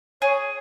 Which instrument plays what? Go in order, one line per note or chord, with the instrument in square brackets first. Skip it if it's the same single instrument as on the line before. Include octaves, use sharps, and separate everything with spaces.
[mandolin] G#4 [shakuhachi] C#5